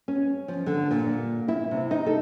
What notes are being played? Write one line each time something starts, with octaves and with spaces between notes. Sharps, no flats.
C#4
F3
D3
A#2
E4
C3
D#4
A4